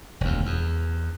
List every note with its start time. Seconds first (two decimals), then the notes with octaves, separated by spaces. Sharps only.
0.21 E1 D2
0.46 E2